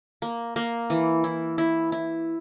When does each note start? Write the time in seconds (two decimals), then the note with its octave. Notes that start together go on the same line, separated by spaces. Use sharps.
0.22 A#3
0.56 A#3
0.90 E3
1.24 E4
1.58 E4
1.92 E4